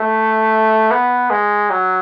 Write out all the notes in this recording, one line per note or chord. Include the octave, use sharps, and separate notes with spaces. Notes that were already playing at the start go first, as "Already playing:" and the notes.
Already playing: A3
B3
G#3
F#3